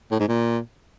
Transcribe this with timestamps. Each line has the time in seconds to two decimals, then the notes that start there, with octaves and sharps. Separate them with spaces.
0.11 A2
0.20 G#2
0.28 A#2